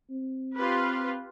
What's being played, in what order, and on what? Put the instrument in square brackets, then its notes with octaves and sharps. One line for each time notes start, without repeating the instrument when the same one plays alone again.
[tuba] C4
[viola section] F4 G4 B4